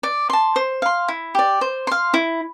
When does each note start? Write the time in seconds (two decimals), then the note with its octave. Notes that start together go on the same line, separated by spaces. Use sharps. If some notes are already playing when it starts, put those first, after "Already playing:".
0.03 D5
0.30 A5 C6
0.56 C5
0.82 F5 C6
1.08 E4
1.35 G4 D5
1.61 C5
1.87 F5 C6
2.14 E4